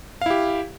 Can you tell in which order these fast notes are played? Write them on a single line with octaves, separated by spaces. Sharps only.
F5 E4 G4